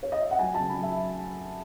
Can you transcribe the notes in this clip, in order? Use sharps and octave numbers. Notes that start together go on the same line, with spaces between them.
C#5
D#5
E5
F#5
F#3 G#5
A5
C#3
B5
F#3 E5